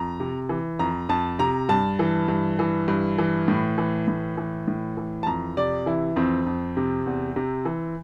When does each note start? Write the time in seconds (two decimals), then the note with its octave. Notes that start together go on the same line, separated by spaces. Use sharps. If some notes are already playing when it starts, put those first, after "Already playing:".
Already playing: F2 A#5
0.20 C3
0.49 E3
0.79 F2 A#5
1.09 F2 A5
1.39 C3 A#5
1.69 G2 A5
1.99 E3
2.28 G2
2.59 E3
2.88 G2
3.18 E3
3.48 A2
3.78 E3
4.08 A2
4.37 E3
4.68 A2
4.97 E3
5.23 A5
5.27 F2 A#5
5.57 C3 D5
5.86 E3 E4
6.16 F2 C4
6.46 F2
6.77 C3
7.06 E2
7.36 C3
7.65 E3